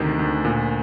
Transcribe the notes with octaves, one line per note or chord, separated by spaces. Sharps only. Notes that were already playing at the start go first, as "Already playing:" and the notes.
Already playing: D2 C3 D#3
D2
A#2